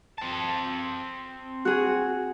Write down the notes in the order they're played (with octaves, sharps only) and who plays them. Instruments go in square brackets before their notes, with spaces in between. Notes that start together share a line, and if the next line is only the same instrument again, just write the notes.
[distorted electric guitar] C4 A5
[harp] F#4 G#4